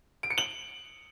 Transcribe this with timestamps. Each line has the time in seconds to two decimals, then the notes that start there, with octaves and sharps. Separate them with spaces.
0.23 D7
0.30 C#7
0.38 F#7